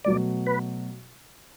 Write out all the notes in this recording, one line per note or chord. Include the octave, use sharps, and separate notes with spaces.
B2 F#3 A3 D5
B4